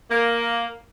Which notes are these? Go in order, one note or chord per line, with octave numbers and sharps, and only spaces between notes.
A#3